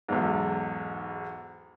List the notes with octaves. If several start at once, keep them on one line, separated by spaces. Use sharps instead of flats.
B1 E2 G#2